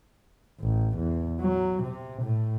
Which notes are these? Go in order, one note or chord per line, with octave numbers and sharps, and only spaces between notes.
A1
E2
F#3
C3
A2